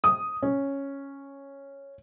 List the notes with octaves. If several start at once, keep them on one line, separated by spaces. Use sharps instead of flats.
D#6
C#4